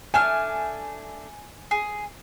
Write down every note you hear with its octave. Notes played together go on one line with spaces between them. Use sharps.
A3 D4 G#5 F6
G#4